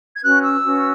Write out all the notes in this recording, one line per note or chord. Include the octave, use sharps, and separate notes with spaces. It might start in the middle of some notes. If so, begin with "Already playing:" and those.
G#6
C#4 F#4 B4 F#6
E6
C#4 F#4 B4